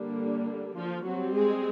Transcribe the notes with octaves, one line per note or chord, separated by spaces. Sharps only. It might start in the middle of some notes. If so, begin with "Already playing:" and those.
Already playing: D3 G3 A#3 D4
F3 F4
F#3 G3 C4 F#4
G#3 G#4